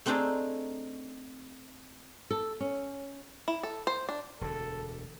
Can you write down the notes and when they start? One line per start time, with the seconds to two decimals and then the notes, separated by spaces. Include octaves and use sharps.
0.06 A3 C4 D4 D#4 G#4 D5
2.31 A4
2.60 C#4
3.48 E4
3.63 A4
3.87 C5
4.09 D4
4.41 E1 D2 D3 A4